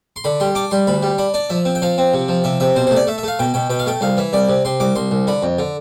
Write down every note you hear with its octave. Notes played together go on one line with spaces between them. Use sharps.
C6
D3 B5
G3 C6
D4 D6
G3 C6
D2 B5
G3
D4 B5
D4 D5
F3 E5
C4
G5
F3 F5
C4
C3
F3
C3 E5
C3 E5
B2 C5
A3 C5
D5
A3 E5
E5
A3 F5
B2 G5
B2 G5
B2 G5
F5
A3 G5
C2 F5
E3 E5
C2 D5
C3
C3 C6
C2 D6
C2 C6
C2
D3 B5
F2
D3